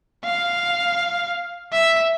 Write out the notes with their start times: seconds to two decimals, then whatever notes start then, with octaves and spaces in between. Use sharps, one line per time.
0.24 F5
1.72 E5